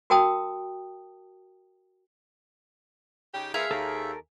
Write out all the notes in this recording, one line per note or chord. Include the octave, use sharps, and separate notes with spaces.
F#4 A#4 G5 A5 D#6
C#3 D#4 G4
F3 B3 G#4 A#4 E5 F5
D#2 A4 A#4